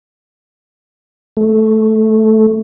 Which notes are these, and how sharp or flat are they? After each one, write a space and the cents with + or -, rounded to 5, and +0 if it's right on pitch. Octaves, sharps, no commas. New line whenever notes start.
A3 -10